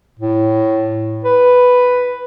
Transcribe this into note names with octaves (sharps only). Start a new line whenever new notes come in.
A2
B4